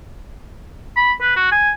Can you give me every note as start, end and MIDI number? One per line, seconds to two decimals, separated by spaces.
0.97 1.13 83
1.21 1.34 71
1.36 1.49 66
1.52 1.72 80